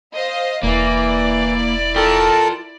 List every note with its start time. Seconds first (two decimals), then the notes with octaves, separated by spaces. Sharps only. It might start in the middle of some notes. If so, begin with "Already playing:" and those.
0.14 C5 D#5 F5
0.63 E1 E3 A#3 E4 D5
1.96 F4 A4 A#4 G5 A5